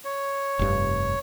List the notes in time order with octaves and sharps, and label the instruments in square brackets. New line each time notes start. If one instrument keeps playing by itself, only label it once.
[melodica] C#5
[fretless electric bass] F1 G2